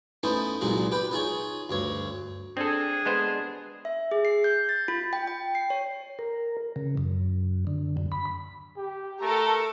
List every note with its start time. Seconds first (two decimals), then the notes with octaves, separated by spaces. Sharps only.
0.23 A3 B3 C#4 D#4 E4 C5
0.61 C2 A#2 F#3 G#3 D#4
0.91 G4 B4 G5
1.11 D#4 F4 G#4 C#5
1.70 D2 G2 C#5
2.57 C4 D4 G#4 A4
3.06 G#3 B3 C5
3.85 E5
4.11 G#4
4.25 C7
4.44 G6
4.69 A6
4.88 F4
5.13 G5
5.27 G5
5.55 C7
5.70 C#5
6.19 A#4
6.76 C#3
6.97 F#2
7.67 D3
7.97 F#2
8.12 B5
8.77 G4
9.21 A3 A4 A#4 A#5